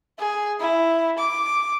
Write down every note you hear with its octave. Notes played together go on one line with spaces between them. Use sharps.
G#4
E4
D6